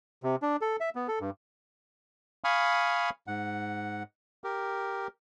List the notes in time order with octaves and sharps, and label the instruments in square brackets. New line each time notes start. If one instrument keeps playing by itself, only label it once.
[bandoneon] C3
D4
A4
E5
B3
A4
G2
F5 G#5 B5 C#6 D#6 F6
G#2 F#5
G4 A#4